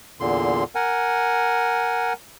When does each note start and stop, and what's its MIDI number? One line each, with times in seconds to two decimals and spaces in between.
0.20 0.64 40
0.20 0.64 46
0.20 0.64 50
0.20 0.64 84
0.75 2.13 70
0.75 2.13 78
0.75 2.13 80